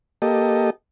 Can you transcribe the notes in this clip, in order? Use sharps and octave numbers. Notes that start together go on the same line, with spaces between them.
A#3 G4 A4 D#5